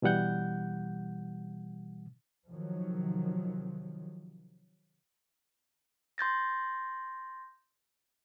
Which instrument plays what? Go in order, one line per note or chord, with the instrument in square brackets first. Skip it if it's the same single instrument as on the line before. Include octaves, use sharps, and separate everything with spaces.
[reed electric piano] B2 E3 G3 F#5 G6
[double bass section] C3 D#3 F3 F#3
[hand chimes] C6 G6 A6 A#6